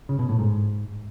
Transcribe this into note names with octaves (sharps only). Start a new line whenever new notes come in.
C#3
B2
A2
G#2